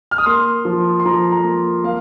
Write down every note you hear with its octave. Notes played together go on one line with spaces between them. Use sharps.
F6
D#6
A#3 C6
F3
C6
F3 A#5
A#5
A#3
A#3 F5